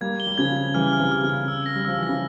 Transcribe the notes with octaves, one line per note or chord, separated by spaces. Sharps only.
G3 A#3 G#6
G7
G3
C#3 F3 G#6
G#6
E3 G3 F6
F6
C3 E3
F6
C#3
F6
E6
A#6
G3
F3 E6
E3
A#6
C#3